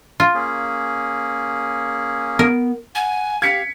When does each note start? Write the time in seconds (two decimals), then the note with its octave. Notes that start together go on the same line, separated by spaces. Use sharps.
0.20 F4
0.34 A#3 C#4 G#4
2.39 B3 A#4
2.95 F#5 G#5
3.42 G4 F5 G#6 B6 C#7